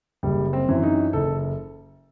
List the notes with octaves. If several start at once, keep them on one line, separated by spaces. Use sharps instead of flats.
F#1 G3
C4
F#2 E3
D#4
F#1 A4